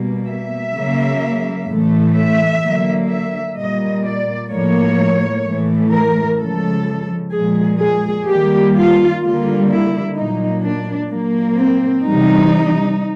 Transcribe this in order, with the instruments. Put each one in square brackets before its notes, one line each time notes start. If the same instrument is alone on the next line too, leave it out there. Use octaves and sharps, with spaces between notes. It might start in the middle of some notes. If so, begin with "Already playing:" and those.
Already playing: [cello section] B2 G3 A#3
E5
C#3 F#3 A#3
A2 E3 A3
E5
D3 F#3 A#3
E5
A#2 G3 A#3 D#5
D5
A2 F3 A#3 C#5
A2 E3 A3
A#4
C#3 F3 G#3 A4
A#2 F3 G#3 G#4
G#4
D#3 G3 A#3 G4
F4
D3 G3 A#3 F4
E4
A#2 F#3 A#3 D#4
D4
A#2 F#3 A#3
C4
C3 E3 G3 D#4